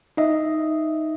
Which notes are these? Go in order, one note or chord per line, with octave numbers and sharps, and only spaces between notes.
D#4 D#5 E5